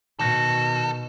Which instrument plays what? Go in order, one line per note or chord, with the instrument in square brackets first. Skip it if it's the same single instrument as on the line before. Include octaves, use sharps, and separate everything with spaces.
[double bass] B2 [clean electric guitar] D#3 F#4 [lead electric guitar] A4